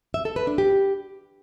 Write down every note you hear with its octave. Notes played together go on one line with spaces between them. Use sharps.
E5
A4
B4
D4
G4